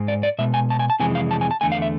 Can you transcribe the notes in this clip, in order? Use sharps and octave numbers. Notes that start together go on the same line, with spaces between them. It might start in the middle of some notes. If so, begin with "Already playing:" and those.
Already playing: G#2 G#3
D5
D5
B2 G#3 E5
G#5
A5
G#5
A5
F2 C3 E3 G#3 G#5
F5
A5
G#5
A5
E2 D3 A3 G#5
F5
E5